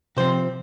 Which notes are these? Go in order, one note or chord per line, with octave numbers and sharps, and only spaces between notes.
C3 F3 C4 C5